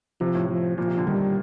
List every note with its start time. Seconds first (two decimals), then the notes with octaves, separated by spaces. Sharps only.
0.21 C3 F3
0.35 A2
0.49 F3
0.78 A#2 F3
0.88 C3
0.97 D3
1.06 D#3 G3